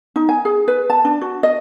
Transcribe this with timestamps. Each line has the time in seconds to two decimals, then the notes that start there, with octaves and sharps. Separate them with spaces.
0.16 D#4
0.29 G#5
0.45 G#4
0.68 B4
0.90 A5
1.05 D4
1.21 F#4
1.43 D#5